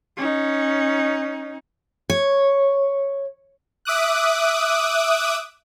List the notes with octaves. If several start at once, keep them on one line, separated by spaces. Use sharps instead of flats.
C#4 D#4
C#5
E5 D6 D#6 F#6